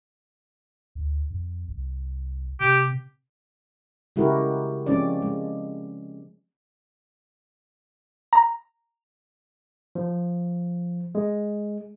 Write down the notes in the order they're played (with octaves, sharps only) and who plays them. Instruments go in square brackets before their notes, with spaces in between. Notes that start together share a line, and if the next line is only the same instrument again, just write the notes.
[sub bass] D2
F2
C2
[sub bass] C3 [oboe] G4
[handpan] C#3 G#3 E4 F#4 G4 A#4
F3 G#3 C4 C#4 D5
G#3
[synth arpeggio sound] A#5
[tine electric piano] F3
G#3